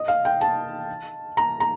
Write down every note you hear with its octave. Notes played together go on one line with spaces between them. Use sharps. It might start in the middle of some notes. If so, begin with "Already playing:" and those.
Already playing: D#5
F5
G5
A5
A#5
A#5